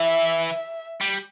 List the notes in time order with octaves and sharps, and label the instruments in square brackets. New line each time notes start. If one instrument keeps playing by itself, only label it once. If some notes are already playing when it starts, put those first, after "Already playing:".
Already playing: [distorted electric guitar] E3 [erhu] E5
[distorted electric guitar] G3